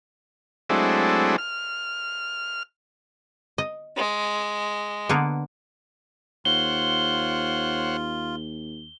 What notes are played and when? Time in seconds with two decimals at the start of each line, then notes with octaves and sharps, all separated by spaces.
0.69 F#3 G#3 A3 C4 D4 E4
1.38 F6
3.58 D#5
3.97 G#3
5.09 D3 A#3 B3
6.45 D#2 F4 C5 C#5 F#5 G7